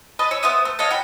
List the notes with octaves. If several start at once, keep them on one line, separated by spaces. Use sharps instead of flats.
B4 D#5 A5
C#5 E6
B3 C5 E5 D#6
A3
A4 C#5 D#5 F5
F#4 G5 B5